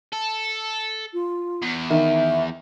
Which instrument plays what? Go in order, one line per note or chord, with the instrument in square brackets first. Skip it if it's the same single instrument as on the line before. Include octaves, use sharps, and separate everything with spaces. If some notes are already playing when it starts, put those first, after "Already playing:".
[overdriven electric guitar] A4
[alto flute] F4
[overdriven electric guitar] E2
[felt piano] D#3 [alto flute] E5